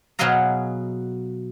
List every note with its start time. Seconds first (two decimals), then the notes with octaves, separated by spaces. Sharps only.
0.19 B2 F#3 G#4 D#5 F5 A#5